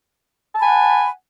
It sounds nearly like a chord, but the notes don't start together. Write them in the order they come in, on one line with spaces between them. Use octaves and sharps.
A5 B5 G#5 F#5